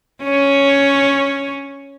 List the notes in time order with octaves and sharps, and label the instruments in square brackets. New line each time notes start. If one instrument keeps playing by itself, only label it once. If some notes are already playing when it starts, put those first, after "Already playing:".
[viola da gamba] C#4 C#5